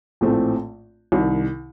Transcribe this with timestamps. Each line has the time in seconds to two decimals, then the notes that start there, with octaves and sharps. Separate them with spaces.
0.21 A#1 A2 A3 C4
1.12 C2 C3 D#3